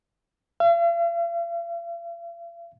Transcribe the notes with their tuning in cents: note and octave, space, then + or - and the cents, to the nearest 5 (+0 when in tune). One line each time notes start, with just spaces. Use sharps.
F5 -45